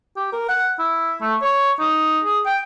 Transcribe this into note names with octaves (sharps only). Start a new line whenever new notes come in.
G4
A#4
F#5
E4
A3
C#5
D#4
G#4
G5